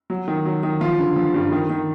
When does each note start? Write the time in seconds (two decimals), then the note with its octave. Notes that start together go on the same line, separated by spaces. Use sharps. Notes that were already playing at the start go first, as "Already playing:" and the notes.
0.10 F#3
0.28 D#3
0.45 F#3
0.63 D#3
0.81 F3 F4
0.99 D3
1.16 F3
1.34 G2
1.52 D#3
1.70 D#3